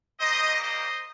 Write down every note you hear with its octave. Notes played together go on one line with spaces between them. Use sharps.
G3 A#3 D#4 G4 C5 D#5
C5 D#5